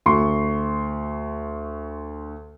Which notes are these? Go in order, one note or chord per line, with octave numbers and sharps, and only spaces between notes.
D2 C6 C#6